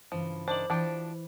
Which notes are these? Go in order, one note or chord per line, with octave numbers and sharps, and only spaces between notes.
G2 C#3 E3 F3
D#3 D4 C5 D6 F#7
E3 F3 D4 G4